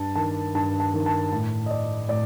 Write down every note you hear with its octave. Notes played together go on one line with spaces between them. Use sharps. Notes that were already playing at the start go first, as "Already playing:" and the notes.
Already playing: G2 A5
D#3 A5
G2 A5
A5
D#3
A5
A2
D#5
D5
A2 D5